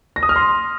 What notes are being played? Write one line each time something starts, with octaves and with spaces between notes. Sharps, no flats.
A#6
D#6
F6
C6